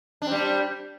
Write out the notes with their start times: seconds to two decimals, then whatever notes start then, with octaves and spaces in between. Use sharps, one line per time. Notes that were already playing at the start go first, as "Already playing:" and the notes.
0.22 D4
0.27 C4
0.32 G3